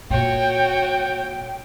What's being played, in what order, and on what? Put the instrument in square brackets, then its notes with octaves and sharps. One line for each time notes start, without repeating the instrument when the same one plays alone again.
[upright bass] A#2 [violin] F#4 C#5 [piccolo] G5